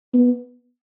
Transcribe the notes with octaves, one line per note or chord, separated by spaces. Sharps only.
B3